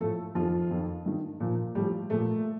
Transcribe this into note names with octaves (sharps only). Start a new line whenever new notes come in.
A2 F3 A3 A4
F2 D#3 F3 F4
F2 D#3
G2 D#3
A#2 F3
A2 F3 G3
A#2 F3 A3